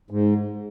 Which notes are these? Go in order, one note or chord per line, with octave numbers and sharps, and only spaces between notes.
G#2